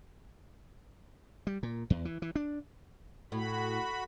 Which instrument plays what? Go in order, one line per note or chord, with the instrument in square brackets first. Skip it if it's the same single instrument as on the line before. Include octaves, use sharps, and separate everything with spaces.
[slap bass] G3
A#2
E2
E3
E3
D4
[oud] A2 [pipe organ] F#4 B5